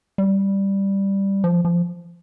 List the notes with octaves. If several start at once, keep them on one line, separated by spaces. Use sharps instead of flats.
G3
F3
F3